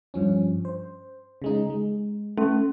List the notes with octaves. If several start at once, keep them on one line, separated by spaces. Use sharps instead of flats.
G2 F3 C#4
C5
C#3 G#3 D#4
G#3
A3 C#4